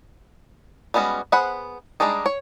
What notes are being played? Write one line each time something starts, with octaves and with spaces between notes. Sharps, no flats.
G3 G#3 B3 C#4 F#4
B3 G#4 C5 F#5 B5
G3 G#3 D4 D#4 G#4
C#5